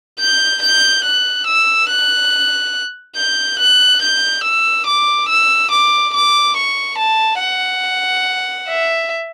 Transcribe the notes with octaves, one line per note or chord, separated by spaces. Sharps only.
G6
G6
F#6
E6
F#6
G6
F#6
G6
E6
D6
E6
D6
D6
C#6
A5
F#5
E5